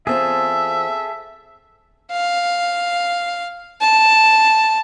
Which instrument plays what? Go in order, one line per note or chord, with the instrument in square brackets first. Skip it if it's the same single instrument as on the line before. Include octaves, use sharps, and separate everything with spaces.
[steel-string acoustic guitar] E2 C4 F4 [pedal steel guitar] G#4 A4 [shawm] E5
[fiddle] F5
A5